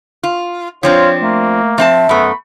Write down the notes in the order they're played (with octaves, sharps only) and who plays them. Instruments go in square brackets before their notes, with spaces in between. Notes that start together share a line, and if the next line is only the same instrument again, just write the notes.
[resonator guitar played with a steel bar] F4
[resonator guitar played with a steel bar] F3 C4 D4 [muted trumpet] F4 [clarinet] C#5
[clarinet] A3 [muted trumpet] A#3
[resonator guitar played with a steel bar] F3 C4 A5 [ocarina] E5
[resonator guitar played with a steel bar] F#2 A3 [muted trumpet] B3 [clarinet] B5